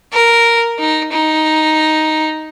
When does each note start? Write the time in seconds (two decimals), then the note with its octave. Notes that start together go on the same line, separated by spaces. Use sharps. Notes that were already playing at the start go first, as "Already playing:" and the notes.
0.13 A#4
0.79 D#4
1.12 D#4